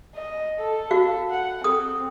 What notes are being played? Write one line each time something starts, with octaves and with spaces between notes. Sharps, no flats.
D#5
A4
F#4 F5
F#5
C4 A4 D#6